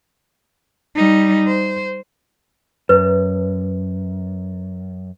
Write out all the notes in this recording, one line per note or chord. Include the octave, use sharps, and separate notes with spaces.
G3 D#4
C5
F#2 B4